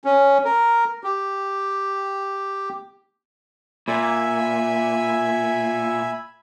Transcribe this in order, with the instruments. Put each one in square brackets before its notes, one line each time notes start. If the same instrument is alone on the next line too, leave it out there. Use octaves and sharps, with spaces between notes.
[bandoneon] C#4
A#4
G4
[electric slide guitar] A#2 [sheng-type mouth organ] E5 G#5 B5